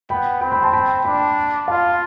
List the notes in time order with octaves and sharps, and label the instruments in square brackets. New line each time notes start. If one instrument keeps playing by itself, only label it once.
[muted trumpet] B3 [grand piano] G5 B5
[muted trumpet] C4 [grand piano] G5 B5
[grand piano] G5 B5
A5 C6
G5 B5
[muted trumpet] D4 [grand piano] G5 B5
[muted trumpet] F4 [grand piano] F5 A5